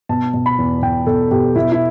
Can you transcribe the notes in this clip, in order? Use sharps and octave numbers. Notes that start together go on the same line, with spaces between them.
B2 A5
B2
B5
E2
B2 G5
B2 A4
B2 G4
B2 E4
E4